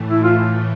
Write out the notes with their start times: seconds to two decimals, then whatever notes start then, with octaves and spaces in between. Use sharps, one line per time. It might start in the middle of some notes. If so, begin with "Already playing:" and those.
Already playing: A2 E3 A3
0.10 E4
0.23 F4